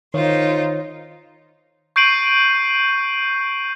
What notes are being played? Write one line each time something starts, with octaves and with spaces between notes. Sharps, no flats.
D#3 D#4 F4 C5 C#5
C#6 G6 C7 D7 D#7 F#7